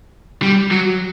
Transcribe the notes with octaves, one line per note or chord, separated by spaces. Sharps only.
G3
F#3